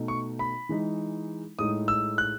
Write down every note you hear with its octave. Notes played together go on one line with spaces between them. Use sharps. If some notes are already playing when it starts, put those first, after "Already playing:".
Already playing: B2 A3 D#4
C#6
B5
E3 G#3 D#4
A2 G#3 D#4 D#6
E6
F#6